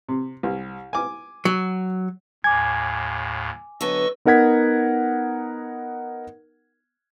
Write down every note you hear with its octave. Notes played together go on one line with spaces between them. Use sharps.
C3
C2
G#5 D6
F#3
D#2 A2 G#5 D6 G#6
D3 F#3 B3 D#5 C#6 E6
B3 D#4 A#4 F#5 G#6 B6